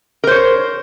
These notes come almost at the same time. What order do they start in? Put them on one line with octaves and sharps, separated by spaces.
A#4 C5 C#5